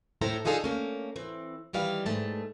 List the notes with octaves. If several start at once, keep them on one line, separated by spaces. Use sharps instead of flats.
A2 E4 A4 C5 A#5
D4 D#4 F4 G#4 A4 F5
A3 A#3 C#4
E3 C4
D#3 E3 G3 F5
G#2 A3 A5